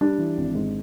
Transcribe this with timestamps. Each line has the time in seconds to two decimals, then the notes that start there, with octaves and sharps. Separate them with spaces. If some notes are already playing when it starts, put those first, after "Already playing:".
0.01 G3 D4
0.18 E3
0.37 G#1
0.55 G#2